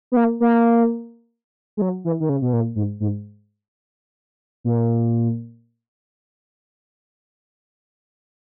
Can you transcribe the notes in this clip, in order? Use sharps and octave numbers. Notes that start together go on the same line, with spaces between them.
B3
A#3
A#3
G#3
F#3
E3
D#3
C#3
B2
A#2
G#2
G#2
A#2